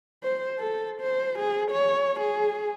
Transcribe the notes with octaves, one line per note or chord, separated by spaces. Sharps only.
C5
A4
C5
G#4
C#5
G#4